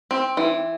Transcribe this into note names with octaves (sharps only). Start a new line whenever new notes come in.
C4
E3